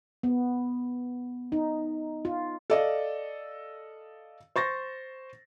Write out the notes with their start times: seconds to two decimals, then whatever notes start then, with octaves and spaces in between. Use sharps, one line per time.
0.23 B3
1.52 D#4
2.25 F4
2.70 A4 D5 D#5 F5
4.56 C5 C#6 A6 A#6